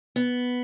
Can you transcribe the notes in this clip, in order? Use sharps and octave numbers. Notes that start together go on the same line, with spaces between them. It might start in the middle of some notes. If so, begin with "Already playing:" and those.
B3